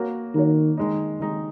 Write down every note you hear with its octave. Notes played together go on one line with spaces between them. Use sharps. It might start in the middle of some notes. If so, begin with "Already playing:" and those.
Already playing: A#3 F#4 C#5
D#3 A#3 F#4 C#5
D#3 G#3 D#4
D#3 G#3 D#4